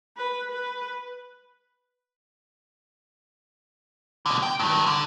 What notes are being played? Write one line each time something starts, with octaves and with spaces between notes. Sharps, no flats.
B4
B4
B2 D3
G5
G2 D#3
D3